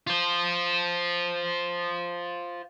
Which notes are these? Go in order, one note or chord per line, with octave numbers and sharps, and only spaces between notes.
F4 C5